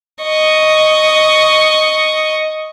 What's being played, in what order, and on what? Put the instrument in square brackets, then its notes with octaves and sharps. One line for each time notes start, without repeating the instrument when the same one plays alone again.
[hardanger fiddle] D#5 C#6